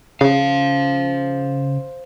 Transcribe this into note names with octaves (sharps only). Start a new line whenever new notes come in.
C#3 C5 F5